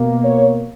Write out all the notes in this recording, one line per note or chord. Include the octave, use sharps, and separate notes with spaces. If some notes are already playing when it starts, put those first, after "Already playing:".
Already playing: B2 A#3
C#5